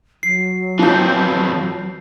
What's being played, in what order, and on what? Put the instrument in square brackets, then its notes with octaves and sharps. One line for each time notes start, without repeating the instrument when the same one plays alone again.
[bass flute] F#3 [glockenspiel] C7
[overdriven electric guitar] F2 E3 [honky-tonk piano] F3 G6